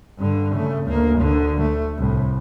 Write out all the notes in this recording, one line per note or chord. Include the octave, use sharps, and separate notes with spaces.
G2 D3
C#3 A3
D2 A#3
D2 D3
A3
C2 A2